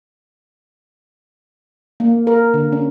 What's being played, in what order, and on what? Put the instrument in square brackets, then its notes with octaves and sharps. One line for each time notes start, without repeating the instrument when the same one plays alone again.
[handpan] A#3
A#4
D3
C#4